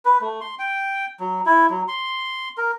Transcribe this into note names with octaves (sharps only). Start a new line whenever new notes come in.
B4
A3
C6
G5
F#3
E4
F#3
C6
A#4